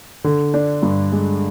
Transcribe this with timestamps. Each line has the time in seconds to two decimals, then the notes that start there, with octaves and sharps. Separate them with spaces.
0.24 D3
0.54 D4
0.83 G2
1.12 G#3